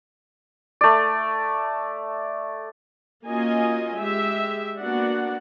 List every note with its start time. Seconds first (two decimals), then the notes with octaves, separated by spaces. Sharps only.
0.81 A3 D5
3.25 A#3 C#4 F4 F#4 D#5 G#5
3.99 G#3 G4 E5
4.78 A#3 B3 D4 F#4 D5 F#5